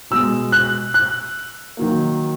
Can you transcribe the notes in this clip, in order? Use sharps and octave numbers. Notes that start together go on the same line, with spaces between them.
B2 G#3 E6
F#6
F#6
D#3 F#3 A#3